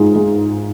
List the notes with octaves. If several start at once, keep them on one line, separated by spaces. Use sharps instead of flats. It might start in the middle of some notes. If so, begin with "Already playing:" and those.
Already playing: G#2 G#3 F4
G#3